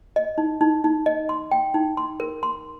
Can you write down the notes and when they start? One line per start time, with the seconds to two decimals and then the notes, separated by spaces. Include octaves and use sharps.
0.16 D#5
0.38 D#4
0.61 D#4
0.84 D#4
1.06 D#5
1.29 C6
1.51 G5
1.74 D#4
1.97 C6
2.20 A#4
2.43 C6